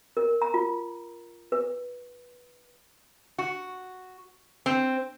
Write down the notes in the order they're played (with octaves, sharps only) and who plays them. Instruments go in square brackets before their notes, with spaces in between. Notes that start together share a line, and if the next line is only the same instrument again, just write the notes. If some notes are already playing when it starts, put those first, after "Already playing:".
[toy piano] A#4
A#5
F4
B4
[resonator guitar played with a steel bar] F#4
C4